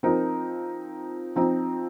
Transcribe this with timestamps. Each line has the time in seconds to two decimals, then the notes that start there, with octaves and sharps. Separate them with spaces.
0.03 F3 C4 D#4 A#4
1.36 F3 C4 D#4